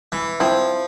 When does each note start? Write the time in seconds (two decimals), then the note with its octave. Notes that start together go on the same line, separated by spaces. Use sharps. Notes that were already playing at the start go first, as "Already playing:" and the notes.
0.12 E3
0.40 F3 C4 E4